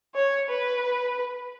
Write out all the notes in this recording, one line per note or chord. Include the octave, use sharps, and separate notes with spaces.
C#5
B4